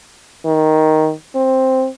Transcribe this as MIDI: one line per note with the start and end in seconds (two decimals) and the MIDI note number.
0.45 1.11 51
1.35 1.87 60